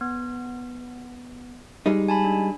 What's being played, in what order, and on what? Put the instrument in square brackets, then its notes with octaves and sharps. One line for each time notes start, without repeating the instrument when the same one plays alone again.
[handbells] B3
[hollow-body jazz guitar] G3 G#3 D#4
[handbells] G#5 A5 B5
D4